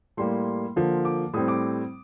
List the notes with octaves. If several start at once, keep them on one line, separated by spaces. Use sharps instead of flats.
A2 G3 A#3 C6
D3 F3 A#3
D6
A2 G3 C4 D#6
D6